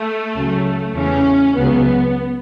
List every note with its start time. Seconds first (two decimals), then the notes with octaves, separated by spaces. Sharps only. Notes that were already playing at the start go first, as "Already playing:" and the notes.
Already playing: A3
0.34 C#2 C#3 F#3
0.94 E2 C#3 E3 C#4
1.55 C#2 C#3 F#3 B3